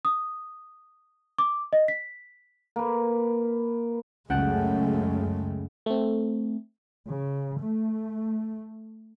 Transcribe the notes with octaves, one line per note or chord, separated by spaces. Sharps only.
D#6
D6
D#5
B6
A#3 B4
C#2 F#2 C#3 G#3 A3 F#5 G5 A5
A3 C4
C#3
A3